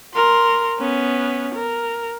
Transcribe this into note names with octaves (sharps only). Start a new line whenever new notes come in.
A#4 C6
B3 C#4
A#4